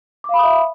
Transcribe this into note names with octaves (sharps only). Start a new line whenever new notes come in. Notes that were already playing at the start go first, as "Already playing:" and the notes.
E5 F5 B5 D6 D#6